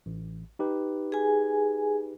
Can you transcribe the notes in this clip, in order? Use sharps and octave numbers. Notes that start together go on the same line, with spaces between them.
A1
D#4 G4 B4
G#4 G#5